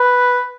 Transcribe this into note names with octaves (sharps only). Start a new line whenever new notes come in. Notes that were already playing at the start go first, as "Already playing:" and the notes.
Already playing: B4